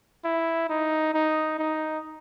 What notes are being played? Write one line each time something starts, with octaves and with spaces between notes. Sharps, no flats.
E4
D#4
D#4
D#4